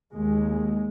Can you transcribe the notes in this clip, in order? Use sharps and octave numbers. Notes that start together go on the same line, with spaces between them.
D#2 G#3